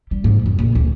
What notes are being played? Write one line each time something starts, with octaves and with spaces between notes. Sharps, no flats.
G3
G#2
F2
A#1
D2